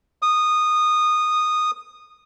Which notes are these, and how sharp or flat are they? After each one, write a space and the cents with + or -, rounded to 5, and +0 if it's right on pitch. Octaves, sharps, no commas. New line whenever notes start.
D#6 -15